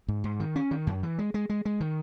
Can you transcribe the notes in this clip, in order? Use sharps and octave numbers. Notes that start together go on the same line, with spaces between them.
G#2
G#2
D#3
C#4
D#3
F#2
E3
G#3
G#3
G#3
G#3
D#3